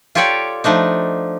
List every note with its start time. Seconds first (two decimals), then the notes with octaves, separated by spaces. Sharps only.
0.15 F4 G4 A4 C#5 D5 G5
0.64 F3 A3 D4 D#4